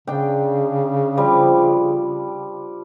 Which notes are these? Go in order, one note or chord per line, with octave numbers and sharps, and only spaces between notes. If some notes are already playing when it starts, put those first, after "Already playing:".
C#3 D4 G5
F3 G3